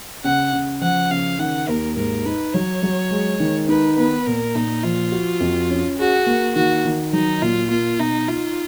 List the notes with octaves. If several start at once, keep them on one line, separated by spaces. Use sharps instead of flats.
C#3 F#5
C#3
F3 F#5
C#3 F5
D#3 F#5
D#2 A#4
G#2 A#4
D#4 B4
F#3 C#5
F#3
G#3
D#3
D#4 B4
B3 B4
A#2 A#4
A#2 D#4
F3 F4
F#4
F2
C#4
F#4 G#4
A#3
D#3 F#4
D#3
F#3 D#4
A#2 F4
A#3 F4
B2 D#4
D#4 F4